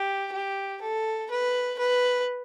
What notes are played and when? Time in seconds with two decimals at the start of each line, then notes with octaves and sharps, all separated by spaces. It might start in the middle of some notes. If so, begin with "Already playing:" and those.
Already playing: G4
0.33 G4
0.82 A4
1.31 B4
1.79 B4